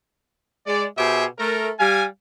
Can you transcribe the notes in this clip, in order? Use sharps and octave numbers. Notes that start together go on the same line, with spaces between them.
G#3 D5
B2 G4 G#4 C5 E5
A3 A#4
G3 F5 G#5